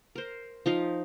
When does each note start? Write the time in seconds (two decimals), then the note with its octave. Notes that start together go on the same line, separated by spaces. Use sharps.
0.15 A#4 C5
0.66 F3 D#4 F5